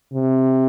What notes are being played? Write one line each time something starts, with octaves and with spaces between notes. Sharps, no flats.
C3